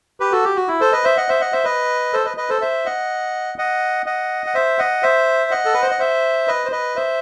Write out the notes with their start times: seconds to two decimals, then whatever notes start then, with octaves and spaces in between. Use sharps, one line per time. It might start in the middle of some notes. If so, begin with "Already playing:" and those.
0.20 G4 B4
0.32 F#4 A4
0.44 G4
0.56 F#4
0.68 E4
0.81 A4 C5
0.92 B4 D#5
1.04 C5 E5
1.17 D#5 F#5
1.29 C5 E5
1.41 D#5 F#5
1.52 C5 E5
1.65 B4 D#5
2.13 A4 C5
2.25 B4 D#5
2.37 B4 D#5
2.50 A4 C5
2.61 C5 E5
2.86 D#5 F#5
3.58 D#5 F#5
4.06 D#5 F#5
4.46 F#5
4.55 C5 E5
4.79 D#5 F#5
5.03 C5 E5
5.51 D#5 F#5
5.65 A4
5.74 B4
5.82 C5
5.91 D#5
5.99 C5 E5
6.48 B4 D#5
6.65 C5
6.72 B4 D#5
6.96 C5 E5